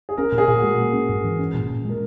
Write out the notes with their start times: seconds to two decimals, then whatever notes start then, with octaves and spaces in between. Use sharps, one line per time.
0.09 G#4
0.17 C#4 A#4
0.32 A#2
0.38 G#4
0.48 A#2
0.58 G#3 F#4
0.78 A#3
0.93 C#4
1.09 G#2
1.24 E3
1.39 C#4
1.54 A#2
1.70 A#2
1.85 G#3 A#4